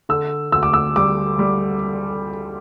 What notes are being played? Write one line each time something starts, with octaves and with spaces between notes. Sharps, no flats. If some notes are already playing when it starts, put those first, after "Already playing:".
D3 E6
D2 E6
D6
E6
G3 D6
G3